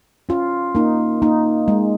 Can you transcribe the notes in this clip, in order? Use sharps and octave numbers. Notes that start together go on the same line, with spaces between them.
C#4 F4
A#3 D#4
A#3 D#4
G#3